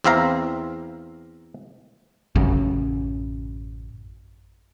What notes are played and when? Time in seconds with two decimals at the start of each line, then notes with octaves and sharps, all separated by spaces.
0.04 E2 C4 E5 F5 A#5
2.35 A1 F#2 C#3